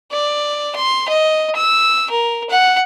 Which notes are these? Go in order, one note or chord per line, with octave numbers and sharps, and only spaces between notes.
D5
C6
D#5
E6
A#4
F#5